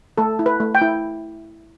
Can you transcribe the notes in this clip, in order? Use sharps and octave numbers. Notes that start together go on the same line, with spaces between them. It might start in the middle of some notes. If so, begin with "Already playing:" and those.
A3 A4
E4
B4
A3
G5
E4